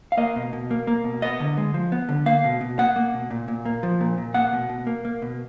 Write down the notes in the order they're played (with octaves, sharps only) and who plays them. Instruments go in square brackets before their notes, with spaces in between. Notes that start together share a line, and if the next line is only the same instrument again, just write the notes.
[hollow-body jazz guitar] F5
A#3 D#5
B2
B2
A#3
A#3
B2
B3 D#5
D3
G#3
F3
B3
D3
A#3 F5
B2
B2
A#3 F#5
A#3
B2
A#2
A#2
A#3
F3
A#2
A#2
A#3 F#5
B2
B2
A#3
A#3
B2